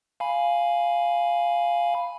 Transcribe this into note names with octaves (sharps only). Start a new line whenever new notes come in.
F5 G#5 B5